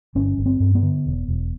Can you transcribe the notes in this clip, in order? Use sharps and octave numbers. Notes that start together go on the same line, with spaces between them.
G1 C#4
G1
C4
G2
B3
D3
E1
E1